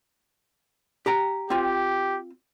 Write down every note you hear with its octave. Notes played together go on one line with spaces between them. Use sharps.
G4 G5 A#5
C4 F4 G4